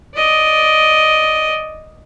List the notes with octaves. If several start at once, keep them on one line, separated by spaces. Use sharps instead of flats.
D5 D#5